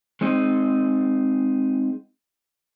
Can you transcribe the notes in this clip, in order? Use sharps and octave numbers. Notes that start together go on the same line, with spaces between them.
G#3 C4 D#4